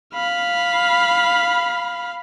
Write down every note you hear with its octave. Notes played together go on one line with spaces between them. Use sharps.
F5 B5